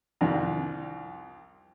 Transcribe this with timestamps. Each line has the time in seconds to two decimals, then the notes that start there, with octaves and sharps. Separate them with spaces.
0.21 C2 F2 D#3 D4